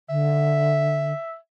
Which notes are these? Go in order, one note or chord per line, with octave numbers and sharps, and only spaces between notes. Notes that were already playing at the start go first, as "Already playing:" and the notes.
D3 E5